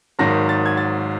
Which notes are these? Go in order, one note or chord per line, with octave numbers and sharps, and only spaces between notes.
G#1 G#2 D#3 F#3 A#6
A6
G#6
A6